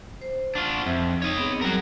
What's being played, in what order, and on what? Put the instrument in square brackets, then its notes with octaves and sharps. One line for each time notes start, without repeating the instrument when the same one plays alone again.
[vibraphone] C5
[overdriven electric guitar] D4 F4 [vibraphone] F#5 C#6
[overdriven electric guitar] F2 [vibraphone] C4 E5
[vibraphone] D#4 [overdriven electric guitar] C#5 D#5
[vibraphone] B3 C4 G#4
[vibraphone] F#3 G3 [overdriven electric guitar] F#4 A#4